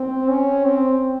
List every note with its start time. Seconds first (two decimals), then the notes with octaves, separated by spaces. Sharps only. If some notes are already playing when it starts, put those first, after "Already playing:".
Already playing: C4
0.29 C#4
0.65 C4